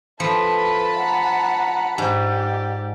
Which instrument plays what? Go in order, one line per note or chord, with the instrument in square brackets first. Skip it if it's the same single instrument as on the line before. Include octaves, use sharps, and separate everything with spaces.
[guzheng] F3 [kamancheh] A4 B4 [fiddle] A5 B5
[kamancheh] F#5 A#5
[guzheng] G#2 [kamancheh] G4 D5